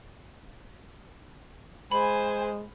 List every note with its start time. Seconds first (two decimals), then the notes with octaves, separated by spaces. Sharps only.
1.91 G#3 C5 G#5 B5